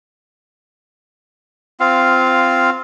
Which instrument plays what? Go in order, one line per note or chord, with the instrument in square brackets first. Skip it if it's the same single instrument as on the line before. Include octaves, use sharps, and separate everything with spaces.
[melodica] C4 F4 F5